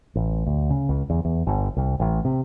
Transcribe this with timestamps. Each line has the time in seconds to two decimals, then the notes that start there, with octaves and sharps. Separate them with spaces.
0.15 A1
0.46 D2
0.70 C#3
0.89 C#2
1.10 E2
1.25 E2
1.47 G1
1.76 C2
2.00 A1
2.25 C3